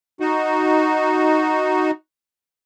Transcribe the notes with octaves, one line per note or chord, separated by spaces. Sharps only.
D#4 F#4